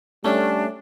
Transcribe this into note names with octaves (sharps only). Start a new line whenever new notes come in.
G3 A3 C#4 D4